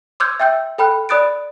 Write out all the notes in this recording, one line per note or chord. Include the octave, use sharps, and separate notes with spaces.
C6 D6 E6 F6 G6 G#6
E5 G5 E6 G6
A4 G5 B5 F6 F#6
D5 B5 D#6 F#6 A6 D7